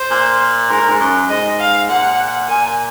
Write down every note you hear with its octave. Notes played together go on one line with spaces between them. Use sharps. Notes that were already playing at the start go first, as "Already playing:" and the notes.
Already playing: C5
A#2
G#2 A#4
A#2
G#2
F#2
G#2 D#5
F5
A#2 F#5
A#2 G#5